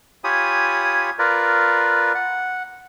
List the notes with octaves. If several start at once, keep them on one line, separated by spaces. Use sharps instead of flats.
F4 G4 C#5 G#5 B5 D#6
F4 A#4 B4 D5
F#5